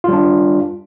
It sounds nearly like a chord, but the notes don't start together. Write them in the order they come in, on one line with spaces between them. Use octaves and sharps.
F4 G3 D4